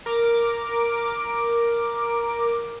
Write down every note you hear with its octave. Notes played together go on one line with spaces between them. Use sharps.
A#4 D6